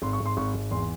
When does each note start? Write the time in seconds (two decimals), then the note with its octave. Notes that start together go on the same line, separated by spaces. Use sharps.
0.02 G#1 C6
0.13 C#6
0.20 G#1
0.26 C6
0.37 G#1 C#6
0.54 G#1
0.71 E2 C6